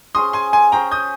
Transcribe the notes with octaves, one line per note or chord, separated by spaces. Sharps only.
C#4 G#4 C5 C6 D#6
G#5 C6
G#5 C6
C#4 G#4 C5 G5 A#5
D#6 G6